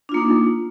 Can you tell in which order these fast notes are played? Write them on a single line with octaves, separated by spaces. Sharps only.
D4 F4 A#3 D#4